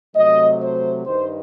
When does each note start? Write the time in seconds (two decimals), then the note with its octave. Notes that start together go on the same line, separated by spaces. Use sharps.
0.15 C3 F#3 A3 D#5
0.60 C5
1.06 G2 D#3 G3 C5